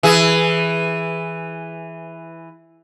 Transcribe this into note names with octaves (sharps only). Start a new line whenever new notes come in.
E3 G#4